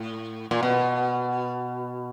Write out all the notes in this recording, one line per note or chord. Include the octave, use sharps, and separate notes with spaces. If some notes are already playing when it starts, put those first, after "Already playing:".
Already playing: A2
A#2
B2